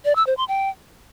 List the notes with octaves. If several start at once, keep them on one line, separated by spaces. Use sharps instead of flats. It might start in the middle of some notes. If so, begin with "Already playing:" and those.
D5
E6
C5
C6
G5